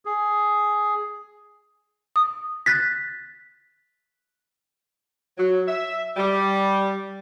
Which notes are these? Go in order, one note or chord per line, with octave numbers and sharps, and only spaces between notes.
G#4
D#6
F#6 A6 B6
F#3
E5
G3